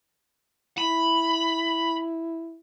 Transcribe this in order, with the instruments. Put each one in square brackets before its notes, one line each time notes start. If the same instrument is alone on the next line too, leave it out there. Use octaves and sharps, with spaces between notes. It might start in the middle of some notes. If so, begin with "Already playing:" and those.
[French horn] E4 [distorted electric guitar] B5